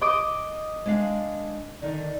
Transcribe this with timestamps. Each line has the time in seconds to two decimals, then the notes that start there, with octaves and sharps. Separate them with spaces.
0.01 D#5 D6
0.86 G#3 D4 F5
1.82 D3 D#3 D5